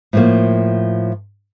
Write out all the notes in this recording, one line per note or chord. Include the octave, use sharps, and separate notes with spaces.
A2 F3 A#3